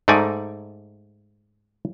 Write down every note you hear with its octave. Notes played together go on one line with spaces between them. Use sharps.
G#2 A3 D#4 D5 G#5